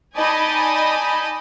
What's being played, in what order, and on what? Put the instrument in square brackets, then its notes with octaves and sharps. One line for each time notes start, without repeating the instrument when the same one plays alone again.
[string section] D#4 D5 D#5 G#5 A5 B5